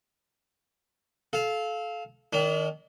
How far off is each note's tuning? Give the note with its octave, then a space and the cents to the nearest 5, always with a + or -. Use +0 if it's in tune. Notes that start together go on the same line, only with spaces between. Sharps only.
A4 -25 F5 +0
D#3 +0 D4 -40